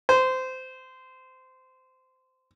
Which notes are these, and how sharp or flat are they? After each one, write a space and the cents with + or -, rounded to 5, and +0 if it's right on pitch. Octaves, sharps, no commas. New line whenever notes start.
C5 -20